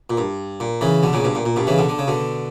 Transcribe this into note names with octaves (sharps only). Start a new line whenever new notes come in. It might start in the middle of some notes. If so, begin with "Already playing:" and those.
A#2
G2
A#2
C#3 E3
B2 D3
A#2 C#3
G2 B2
A#2
A#2
G2 B2
C#3 E3
B2 D3
D3
C#3
B2 D3